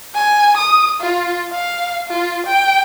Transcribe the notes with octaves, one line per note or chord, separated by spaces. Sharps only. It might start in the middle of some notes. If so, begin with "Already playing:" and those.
G#5
D#6
F4
F5
F4
G5